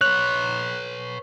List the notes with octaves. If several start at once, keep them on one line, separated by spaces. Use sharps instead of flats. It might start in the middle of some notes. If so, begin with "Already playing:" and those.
B4 C#5 F#6